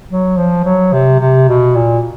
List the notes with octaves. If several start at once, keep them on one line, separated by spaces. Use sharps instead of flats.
F#3
F3
F#3
C3
C3
B2
A#2